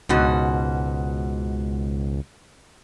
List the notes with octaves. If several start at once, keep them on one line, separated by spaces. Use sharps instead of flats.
C#2 G#2 B2 F#4